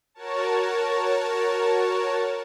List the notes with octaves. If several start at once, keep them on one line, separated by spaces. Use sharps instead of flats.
F#4 A#4 C#5 A5